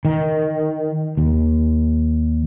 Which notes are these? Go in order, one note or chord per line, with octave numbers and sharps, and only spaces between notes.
D#3
D#2